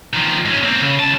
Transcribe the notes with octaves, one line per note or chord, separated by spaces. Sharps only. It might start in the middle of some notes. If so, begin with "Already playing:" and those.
D#3 F3
G#2 C#4
A#3 C4
C#3
C#2 A5